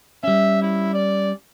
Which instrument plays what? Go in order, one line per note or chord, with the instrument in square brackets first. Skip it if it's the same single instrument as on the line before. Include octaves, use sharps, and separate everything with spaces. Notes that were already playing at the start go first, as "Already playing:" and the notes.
[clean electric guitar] G3 C#4 [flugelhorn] E5
[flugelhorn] E4
D5